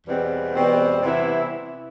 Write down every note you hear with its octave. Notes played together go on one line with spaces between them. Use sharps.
E2 B2 G3 C4
E2 B2 G3 C4
C3 E3 B3 E4